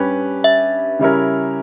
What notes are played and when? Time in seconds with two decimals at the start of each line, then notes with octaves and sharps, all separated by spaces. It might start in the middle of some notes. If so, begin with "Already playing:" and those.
Already playing: G2 G3 C#4 G4 B4
0.44 E5
0.99 C#3 G3 C#4 E4 A#4